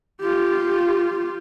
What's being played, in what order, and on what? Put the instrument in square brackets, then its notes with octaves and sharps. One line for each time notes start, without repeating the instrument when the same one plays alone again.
[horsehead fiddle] F4 G4